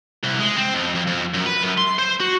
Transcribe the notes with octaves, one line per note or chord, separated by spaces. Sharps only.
C2
G#3
C4
F2
F2
F2
F#2
B4
F#2
C6
C5
F#4